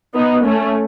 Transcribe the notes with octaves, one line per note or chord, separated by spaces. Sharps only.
B3 D#4
A3 C#4